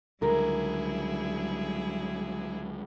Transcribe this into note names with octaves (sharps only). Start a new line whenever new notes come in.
C#2 D3 F#3 G3 E4 G#4 A#4